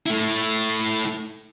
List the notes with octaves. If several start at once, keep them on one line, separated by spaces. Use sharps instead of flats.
A3 E4